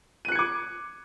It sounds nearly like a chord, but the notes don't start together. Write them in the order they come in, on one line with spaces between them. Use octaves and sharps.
D#7 F#6 C#7 G#6 D6